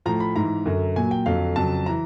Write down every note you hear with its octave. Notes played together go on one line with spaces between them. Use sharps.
A2 F3 A#5
B5
G#2 E3 A#5
F#2 D3 F#3
A#2 F#3 G#5
G5
F2 D3 F#3 F5
F2 C#3 F#3 A5
E3 A#5